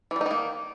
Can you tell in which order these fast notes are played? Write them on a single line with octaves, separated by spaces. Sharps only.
E3 G3 D#4 D#3 A#3